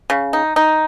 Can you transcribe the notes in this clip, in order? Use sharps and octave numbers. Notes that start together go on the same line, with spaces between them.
C#3
D#4
D#4